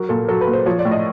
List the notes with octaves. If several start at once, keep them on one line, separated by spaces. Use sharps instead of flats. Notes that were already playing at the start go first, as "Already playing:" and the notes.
Already playing: F#3 A#4
A#2 A4
F#3 A4
B4
A#2
C5
F3 C#5
D5
A2
D#5